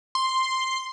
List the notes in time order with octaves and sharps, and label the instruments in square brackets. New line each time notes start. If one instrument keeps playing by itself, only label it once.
[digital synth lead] C6